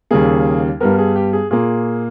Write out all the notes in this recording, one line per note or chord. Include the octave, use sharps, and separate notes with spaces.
D#2 C#3 G3 A#3 G#4
G2 G3 B3 A#4
G#4
G4
G#4
A#2 A#3 G#4